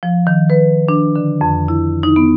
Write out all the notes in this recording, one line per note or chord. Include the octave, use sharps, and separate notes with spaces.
F3
D#3
B4
D4
D3
F2
E4
D#4
B3